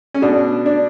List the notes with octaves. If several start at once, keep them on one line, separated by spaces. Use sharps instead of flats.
C#4
B2 D4
D4